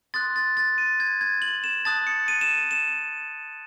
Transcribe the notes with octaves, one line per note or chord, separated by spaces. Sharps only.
C6 D#6 F#6 A6
A6
A6
D#7
G#6
G#6
F#7
E7
A5 D#6 F#6 A6
C#7
D#7
E7
D#7
E7